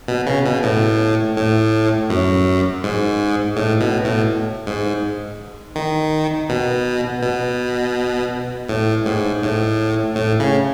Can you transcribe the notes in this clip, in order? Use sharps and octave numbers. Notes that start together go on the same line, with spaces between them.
B2
C#3
B2
A2
A2
F#2
G#2
A2
B2
A2
G#2
D#3
B2
B2
A2
G#2
A2
A2
C#3